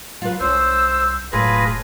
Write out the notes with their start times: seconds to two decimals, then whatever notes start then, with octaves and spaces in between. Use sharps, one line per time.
0.22 F#3 F4 B4
0.40 C2 C#4 C5 E6
1.32 E1 F#2 A2 F4 G#4 B4 A#6